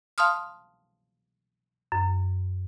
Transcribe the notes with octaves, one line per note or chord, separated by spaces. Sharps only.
F5 A5 C6 D#6 F6
F#2